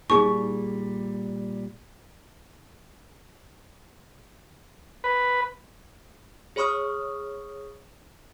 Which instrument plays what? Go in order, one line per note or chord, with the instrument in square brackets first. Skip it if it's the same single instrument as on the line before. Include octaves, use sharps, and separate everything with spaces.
[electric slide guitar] A#2 G3 [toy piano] D#4 G#4 [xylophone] C#6
[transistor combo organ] B4
[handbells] G#4 C#5 B5 C#6 D#6 F6